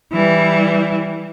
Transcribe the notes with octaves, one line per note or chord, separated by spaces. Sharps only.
E3 G3